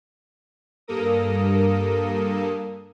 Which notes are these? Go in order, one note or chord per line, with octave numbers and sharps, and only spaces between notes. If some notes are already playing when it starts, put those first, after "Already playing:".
G2 A#3 A4 A#4 D#6